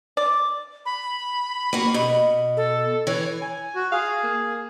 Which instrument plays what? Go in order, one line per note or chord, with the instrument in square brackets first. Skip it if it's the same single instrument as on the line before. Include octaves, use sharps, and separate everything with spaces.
[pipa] D5
[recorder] B5
[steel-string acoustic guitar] A#3 F#4
B2
[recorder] A4
[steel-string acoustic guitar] E3 [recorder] C#5
[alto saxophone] G#5
[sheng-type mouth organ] F#4
[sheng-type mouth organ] G#4 [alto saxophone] F5
[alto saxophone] A#3